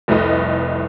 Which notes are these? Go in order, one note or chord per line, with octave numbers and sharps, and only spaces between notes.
F1 C2 A3 B4 D#5